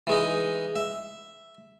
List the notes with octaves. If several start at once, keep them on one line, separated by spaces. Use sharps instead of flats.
E3 G#3 D#4
E5